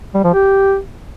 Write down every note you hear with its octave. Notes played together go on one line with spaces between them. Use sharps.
G3
F3
G4